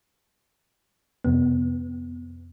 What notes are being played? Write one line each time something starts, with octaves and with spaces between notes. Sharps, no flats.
F2 C3 B3